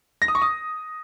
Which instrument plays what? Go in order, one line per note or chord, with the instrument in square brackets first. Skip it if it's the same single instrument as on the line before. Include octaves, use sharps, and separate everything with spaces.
[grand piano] A#6
D#6
C#6
D#6